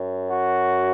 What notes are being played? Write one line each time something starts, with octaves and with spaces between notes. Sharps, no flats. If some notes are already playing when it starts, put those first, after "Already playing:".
Already playing: F#2
F#4